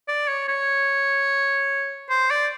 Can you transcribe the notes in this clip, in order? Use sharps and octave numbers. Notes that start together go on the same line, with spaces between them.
D5
C#5
C#5
C5
D5